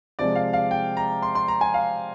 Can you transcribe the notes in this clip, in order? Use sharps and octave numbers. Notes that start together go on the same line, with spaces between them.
C3 F3 G#3 D5
F5
F5
G5
A#5
C6
C6
A#5
G#5
F5